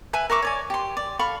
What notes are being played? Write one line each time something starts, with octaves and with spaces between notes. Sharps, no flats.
B4 E5 G#5
A#4 E5 C#6 D6
C#5 D5 G#5
G4 C6
D5
A4 F5 B5 C#6